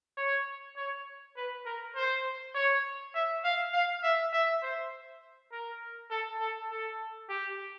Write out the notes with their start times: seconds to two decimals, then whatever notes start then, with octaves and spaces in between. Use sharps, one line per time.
0.17 C#5
0.76 C#5
1.37 B4
1.66 A#4
1.95 C5
2.54 C#5
3.14 E5
3.44 F5
3.73 F5
4.03 E5
4.33 E5
4.62 C5
5.52 A#4
6.10 A4
6.40 A4
6.70 A4
7.29 G4